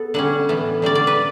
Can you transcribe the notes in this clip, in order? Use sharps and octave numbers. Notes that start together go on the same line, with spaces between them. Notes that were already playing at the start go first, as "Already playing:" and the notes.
Already playing: B3 A4
D3 G3 C#4 F#5
A2 E3 B3
D3 G3 C#4 D5
D5
B4